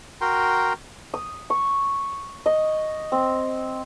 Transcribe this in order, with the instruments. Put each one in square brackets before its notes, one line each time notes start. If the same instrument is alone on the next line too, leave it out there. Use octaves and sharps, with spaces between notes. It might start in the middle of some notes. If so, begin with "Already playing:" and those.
[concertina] F#4 A#4 G5 A#5 C6
[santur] D#6
C#6
D#5
C4